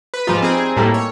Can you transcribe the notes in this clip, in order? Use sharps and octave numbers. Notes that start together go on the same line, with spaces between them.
B4
G#2 F3 G3 G#3 D#4 F4
C4 G#4
A2 G3 A#3 A4 A#4 A5
C#5